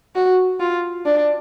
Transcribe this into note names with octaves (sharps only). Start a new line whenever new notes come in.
F#4
F4
D4